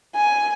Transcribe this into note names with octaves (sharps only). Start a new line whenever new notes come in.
G#5